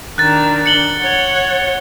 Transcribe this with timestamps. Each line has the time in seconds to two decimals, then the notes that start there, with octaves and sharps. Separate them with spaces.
0.18 D#3 D4 F#6 A6
0.66 C#7 F#7 G7
1.00 C#5 F#5